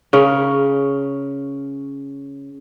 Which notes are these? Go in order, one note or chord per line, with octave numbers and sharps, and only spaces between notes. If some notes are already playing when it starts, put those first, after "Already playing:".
C#3 C#4 A#4